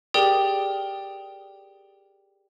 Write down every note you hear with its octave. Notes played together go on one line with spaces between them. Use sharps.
G4 G#4 A#4 D5 G5 D#6